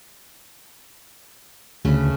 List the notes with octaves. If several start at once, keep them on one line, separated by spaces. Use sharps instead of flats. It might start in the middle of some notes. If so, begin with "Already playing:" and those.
D2 C#3 A3 B4